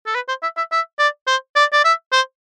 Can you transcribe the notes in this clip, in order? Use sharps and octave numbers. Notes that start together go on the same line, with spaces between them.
A4
B4
C5
E5
E5
E5
D5
C5
D5
D5
E5
C5